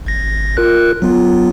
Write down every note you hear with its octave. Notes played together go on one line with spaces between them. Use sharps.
G#1 A#6
F4 A#4 F#6
F#3 B3 F4